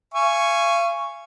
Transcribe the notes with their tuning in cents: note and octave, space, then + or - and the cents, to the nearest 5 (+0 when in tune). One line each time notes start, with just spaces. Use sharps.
F5 -35 G#5 +0 C#6 +0